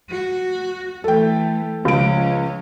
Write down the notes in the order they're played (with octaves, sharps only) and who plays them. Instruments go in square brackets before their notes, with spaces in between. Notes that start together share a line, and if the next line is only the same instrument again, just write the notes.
[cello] F#4
[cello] E3 A3 [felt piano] A4 G5
[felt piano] C#2 D7 [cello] F3 C#4